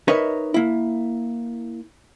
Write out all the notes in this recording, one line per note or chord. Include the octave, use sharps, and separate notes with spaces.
D#4 A#4 B4 C#5 D#5 E5
A#3 E4